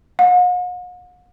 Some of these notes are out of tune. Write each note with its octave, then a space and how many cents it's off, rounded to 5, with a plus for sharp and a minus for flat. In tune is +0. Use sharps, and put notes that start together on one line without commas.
F#5 -45